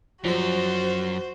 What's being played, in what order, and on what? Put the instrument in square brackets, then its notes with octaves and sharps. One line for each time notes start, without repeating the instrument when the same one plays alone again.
[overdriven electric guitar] F#2 [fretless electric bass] F3 G3 [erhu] F#4 [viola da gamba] C5